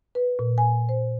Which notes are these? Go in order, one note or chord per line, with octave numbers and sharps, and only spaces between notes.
B4
A#2
G#5
C5